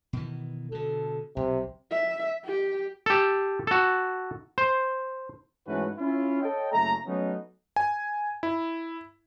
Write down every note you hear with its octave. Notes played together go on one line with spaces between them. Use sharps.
B2 D#3 E3
B2 D3 A4
B1 C3
E5
G4
G4 A4
F#4 A4
C5
G#2 E3 A3 C#4 F#4 B4
C#4 E4 F4
A4 C#5 D#5 G5
F#1 C#3 A3 A#5
F#3 A3 B3 C#4 D#4
G#5
E4